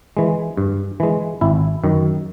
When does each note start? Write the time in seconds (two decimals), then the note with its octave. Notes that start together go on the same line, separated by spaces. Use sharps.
0.17 E3 G#3
0.57 G2
1.00 E3 G#3
1.41 G#1 E4
1.84 F#2 D#3